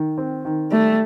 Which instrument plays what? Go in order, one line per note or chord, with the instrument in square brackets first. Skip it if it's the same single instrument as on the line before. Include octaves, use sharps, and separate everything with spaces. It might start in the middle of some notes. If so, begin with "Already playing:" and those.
Already playing: [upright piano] D#3
C4
D#3
[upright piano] G3 [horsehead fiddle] A3